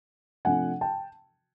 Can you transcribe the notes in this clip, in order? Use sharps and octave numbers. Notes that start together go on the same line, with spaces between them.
C3 F3 A3 D4 F#5 G#5
G5 A5